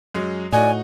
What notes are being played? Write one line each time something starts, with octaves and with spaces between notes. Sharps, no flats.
F#2 F#3 G#3
A2 D#4 F#4 D5 G#5